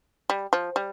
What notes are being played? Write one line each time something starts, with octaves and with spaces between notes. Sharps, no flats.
G3
F3
G3